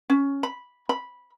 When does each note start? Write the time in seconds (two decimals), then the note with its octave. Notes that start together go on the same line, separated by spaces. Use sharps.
0.10 C#4
0.43 B5
0.89 B5